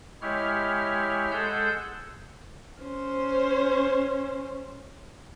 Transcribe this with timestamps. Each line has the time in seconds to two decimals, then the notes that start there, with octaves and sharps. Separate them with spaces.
0.22 G#3 E4 G4 C#5 F6
1.31 G#3 G#4 A4 F#5 E6 G6
2.81 C#4 C5